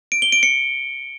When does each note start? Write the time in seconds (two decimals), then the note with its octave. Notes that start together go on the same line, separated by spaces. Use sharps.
0.12 D7
0.22 G7
0.32 D7
0.43 C#7